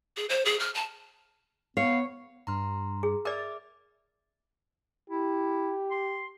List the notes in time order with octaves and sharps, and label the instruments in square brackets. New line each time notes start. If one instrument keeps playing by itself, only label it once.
[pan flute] G#4
C5
G#4
F6
A5
[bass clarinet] B3 [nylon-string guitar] C#5 [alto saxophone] F5
[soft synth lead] G2 [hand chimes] A#5 C6 F6
[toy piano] G#4
[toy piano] A#4 D5 [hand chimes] E5 D6 F6 [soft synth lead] A6
[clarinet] E4 [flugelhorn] G4
[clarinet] C6